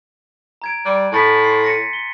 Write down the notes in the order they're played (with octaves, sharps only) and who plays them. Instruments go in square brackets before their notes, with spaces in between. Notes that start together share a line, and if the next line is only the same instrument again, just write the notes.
[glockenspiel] A#5 G#6 D7
[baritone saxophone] G3 [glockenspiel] F#6
[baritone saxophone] A2 [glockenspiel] G#5 A6 B6
[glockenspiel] C6 C7
A#6 C#7 D#7
G7